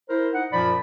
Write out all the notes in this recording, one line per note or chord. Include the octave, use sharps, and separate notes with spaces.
E4 A#4 C5
D#4 F#5
F#2 A#2 F3 D5 B5